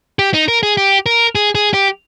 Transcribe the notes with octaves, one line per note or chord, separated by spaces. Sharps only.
G4
D#4
A#4
G#4
G4
A#4
G#4
G#4
G4